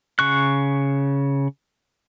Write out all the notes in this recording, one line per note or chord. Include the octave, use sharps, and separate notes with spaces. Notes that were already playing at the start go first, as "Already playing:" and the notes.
C#3 C#6 F#6